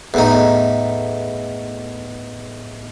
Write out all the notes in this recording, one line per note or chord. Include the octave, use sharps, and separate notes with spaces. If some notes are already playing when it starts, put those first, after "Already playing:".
E2 A2 D#4